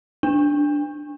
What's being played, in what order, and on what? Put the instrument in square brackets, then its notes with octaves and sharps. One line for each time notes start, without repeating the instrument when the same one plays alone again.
[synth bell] D4